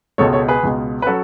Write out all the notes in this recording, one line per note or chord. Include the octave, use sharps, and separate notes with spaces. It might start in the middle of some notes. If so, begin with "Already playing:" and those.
C#2 B2 G#3 A4 C#5
A4 C#5
G#4 B4
C#2 B2 G#3
B4
F#3 C#4 F#4 A4